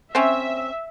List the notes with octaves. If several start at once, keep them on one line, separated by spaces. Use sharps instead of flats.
C4 C#4 E5